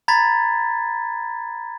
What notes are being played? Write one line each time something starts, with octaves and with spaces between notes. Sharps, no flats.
A#5 B5 G#6 A6 B6